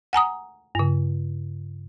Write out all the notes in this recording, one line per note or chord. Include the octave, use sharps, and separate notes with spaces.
F#5 G#5 A#5 D#6
G2 C#3